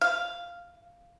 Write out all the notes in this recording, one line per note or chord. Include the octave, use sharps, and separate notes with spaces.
F5